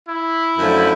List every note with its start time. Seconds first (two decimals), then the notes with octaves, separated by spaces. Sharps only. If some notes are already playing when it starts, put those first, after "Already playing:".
0.09 E4
0.58 F#2 D3 F3 A3